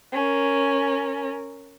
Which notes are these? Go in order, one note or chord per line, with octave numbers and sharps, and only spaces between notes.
C#4 A#4